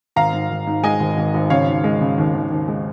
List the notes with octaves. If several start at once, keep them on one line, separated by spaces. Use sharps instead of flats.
G#1 F5 A#5
G#2
G#1
G#2
G#3 D#5 G#5
G#1
G#1
G#1
C#3 C#5 F5
D#2
G#3
C#3
D#2
D#2
D#2
G#3